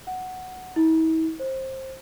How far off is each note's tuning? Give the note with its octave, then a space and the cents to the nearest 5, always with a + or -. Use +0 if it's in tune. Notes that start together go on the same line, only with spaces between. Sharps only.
F#5 +0
E4 -45
C5 +20